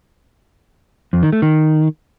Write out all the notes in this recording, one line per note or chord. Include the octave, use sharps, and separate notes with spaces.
F2
D#3
A3
D#3